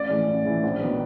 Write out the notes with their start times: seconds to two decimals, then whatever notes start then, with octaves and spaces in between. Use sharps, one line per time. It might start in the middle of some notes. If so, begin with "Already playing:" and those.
Already playing: A1 D5
0.09 A2 E3 G#3
0.27 A1
0.45 A2 E3 G#3
0.63 A#1
0.81 D#3 F#3 B3